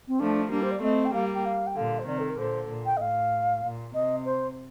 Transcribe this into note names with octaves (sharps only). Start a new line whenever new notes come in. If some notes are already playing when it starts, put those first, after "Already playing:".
C4
F3 A3 D4
G3 A#3 D4
C5
D5
A3 C4 D#5
G5
G3 A#3 F5
G5
F5
G5
A#2 D3 F5
C5
C3 D#3 D5
A4
A#4
A#2 D3 C5
A#2
G5
D#5
A2 F5
A#2
C3 D#5
C5